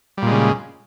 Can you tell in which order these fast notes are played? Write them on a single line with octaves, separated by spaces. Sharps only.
G3 A#2 G#3 C#3